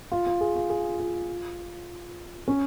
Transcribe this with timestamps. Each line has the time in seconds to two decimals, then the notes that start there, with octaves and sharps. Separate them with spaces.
0.12 F4
0.26 F4
0.41 G#4
0.56 F4
0.70 G#4
1.00 F4
2.48 C#4